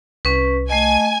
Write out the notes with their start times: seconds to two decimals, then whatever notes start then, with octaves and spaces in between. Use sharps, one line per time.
0.25 C2 C#4 B4
0.70 A3 D#5 G#5